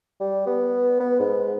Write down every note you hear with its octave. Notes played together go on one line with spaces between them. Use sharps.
G3
B3
B3
G#2